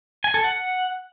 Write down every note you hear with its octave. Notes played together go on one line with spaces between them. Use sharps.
G#5
A4
F#5